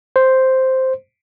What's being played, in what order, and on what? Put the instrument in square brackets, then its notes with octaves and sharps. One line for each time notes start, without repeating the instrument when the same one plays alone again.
[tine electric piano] C5